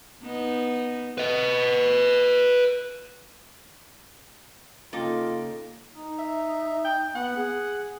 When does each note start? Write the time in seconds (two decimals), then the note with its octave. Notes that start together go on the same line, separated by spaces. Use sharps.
0.22 B3 D#4
1.18 B4 D#5
4.93 C#3 A#3 D#4 F4 A4 G5 D6
5.95 D#4
6.19 E5
6.85 G5
7.15 B3 F#5
7.36 G#4